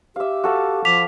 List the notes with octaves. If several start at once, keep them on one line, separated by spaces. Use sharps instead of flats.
G4 E5 F5
F#4 A4 F5
F3 D6 B6 F7